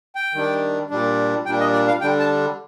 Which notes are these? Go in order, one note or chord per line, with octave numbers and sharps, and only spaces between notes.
G5
D#3 G3 D4
A#2 G3 D4
A#2 G3 D4 G5
D#5
D5
F5
D3 G3 D4 G5
A5